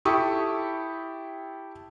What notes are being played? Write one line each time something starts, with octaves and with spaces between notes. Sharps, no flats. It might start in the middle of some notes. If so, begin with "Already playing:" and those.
E4 G4 A4 C#6 D#6